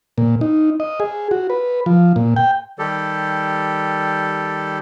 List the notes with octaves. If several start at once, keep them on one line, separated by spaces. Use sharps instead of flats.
A#2
D#4
D#5
G#4
F#4
B4
F3
A#2
G5
D#3 G3 G4 A4